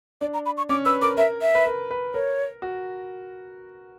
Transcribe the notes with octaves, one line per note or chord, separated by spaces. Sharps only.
D4 D5
A#5
B5
C#6
C#4 D6
B4 E6
A#4 D6
A#4 E5
E5
B4
A#4
B4
A#4 C#5
F#4